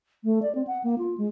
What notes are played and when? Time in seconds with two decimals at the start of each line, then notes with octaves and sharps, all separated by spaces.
0.24 A3
0.42 D5
0.55 C4
0.67 F#5
0.84 A#3
0.98 F4
1.18 G#3